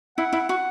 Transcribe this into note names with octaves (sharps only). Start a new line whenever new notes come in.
E4 F#5
E4
F#4 F#5